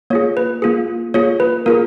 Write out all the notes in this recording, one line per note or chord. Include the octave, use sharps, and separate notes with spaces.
A#3 F4 G#4 C#5
B4
A#3 F4 G#4
A#3 F4 G#4 C#5
B4
A#3 F4 G#4 A#4